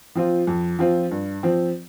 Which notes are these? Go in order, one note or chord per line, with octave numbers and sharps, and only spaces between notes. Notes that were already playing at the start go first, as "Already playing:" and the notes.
F3 C4 F4
F2
F3 C4 F4
G2
F3 C4